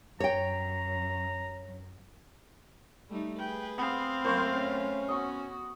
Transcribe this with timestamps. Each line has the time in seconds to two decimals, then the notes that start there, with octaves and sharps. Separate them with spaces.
0.20 F#2 C#5 G5 A#5
3.09 G3 A3 D#4
3.39 G#4 B4 G5
3.78 B3 C4 F5
4.25 F#2 A3 A#3 C5 C6 C#6
4.54 C#4
5.08 B3 F#4 D#5 C#6